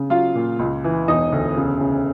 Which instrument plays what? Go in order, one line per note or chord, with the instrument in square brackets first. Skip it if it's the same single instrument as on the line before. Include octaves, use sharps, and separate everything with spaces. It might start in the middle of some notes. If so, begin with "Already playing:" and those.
Already playing: [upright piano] C#3
F#3 F4 F5
A#2
C#2
E3
E1 D#4 D#5
D2
C#3
C#3